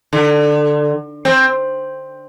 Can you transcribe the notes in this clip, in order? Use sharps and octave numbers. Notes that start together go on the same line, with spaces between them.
D3
C4